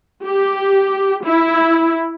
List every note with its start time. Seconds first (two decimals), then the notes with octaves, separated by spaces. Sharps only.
0.25 G4
1.26 E4